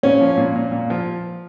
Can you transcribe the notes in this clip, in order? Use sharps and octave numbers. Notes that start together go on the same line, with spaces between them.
A#2 C#4
F3
A#2
A#2
A#2
F3